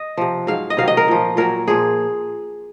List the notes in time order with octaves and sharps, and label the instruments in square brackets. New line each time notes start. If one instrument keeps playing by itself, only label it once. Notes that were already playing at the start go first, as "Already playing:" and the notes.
Already playing: [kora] D#5
C3 F3
G#2 F#3 F5
D#5
C3 D#3 F#3 F5
D#5
A#4
A#2 F3
A#2 F#3 A#4
A#2 F3 G#4